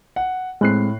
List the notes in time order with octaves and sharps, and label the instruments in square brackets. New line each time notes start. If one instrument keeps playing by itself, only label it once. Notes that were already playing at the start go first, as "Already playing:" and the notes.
[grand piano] F#5
[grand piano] A2 F#6 C7 [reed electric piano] G#3 C4